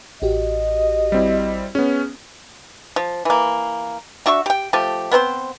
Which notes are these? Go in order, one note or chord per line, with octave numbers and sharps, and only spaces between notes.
A1 F#4 G4 D#5
G3 C4 E4
B3 C#4 G#4 C#5 F6
F3
E3 A#3
D4 F#4 E5 C#6
G4 G5
F3 A3 G4
B3 C4 A#4 C5